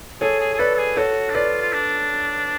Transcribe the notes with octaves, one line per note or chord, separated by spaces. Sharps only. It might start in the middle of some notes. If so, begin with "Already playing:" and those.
G#4 A4 C#5
G#4
G#4
A4 B4 D5
A4
G#4
F#4 A4 C#5
D4
F4 B4 D5
F4
D4